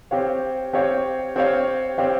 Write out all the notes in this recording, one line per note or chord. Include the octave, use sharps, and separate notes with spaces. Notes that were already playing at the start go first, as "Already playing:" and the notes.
C4 G4 C#5 F5
C4 G4 C#5 F5
C4 G4 C#5 F5
C4 G4 C#5 F5